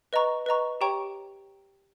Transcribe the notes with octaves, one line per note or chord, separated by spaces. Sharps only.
B4 D#5 A#5 C#6
B4 D#5 A#5 C#6
G4 C#5 G5 A#5 C#6